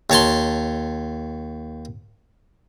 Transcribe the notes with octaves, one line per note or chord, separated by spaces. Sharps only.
D#2 C#5 A5 C6